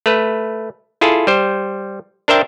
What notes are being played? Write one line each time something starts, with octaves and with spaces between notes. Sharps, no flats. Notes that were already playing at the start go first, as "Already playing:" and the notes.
A3 B4
E4 F4 G#4 A4
G3 C5
D4 A#4 C5 E5 G5 A5